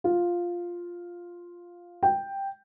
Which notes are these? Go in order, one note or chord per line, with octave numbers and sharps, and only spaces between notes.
F4
G5